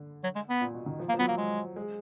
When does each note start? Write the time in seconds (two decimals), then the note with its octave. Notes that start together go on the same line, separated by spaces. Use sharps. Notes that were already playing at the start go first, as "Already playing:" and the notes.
Already playing: D3
0.24 F#3
0.35 G#3
0.49 B3
0.61 A#2
0.74 B2
0.86 D#3
0.99 F3
1.09 A#3
1.14 F3
1.19 F#3 B3
1.28 A#3
1.38 G#3
1.76 G#3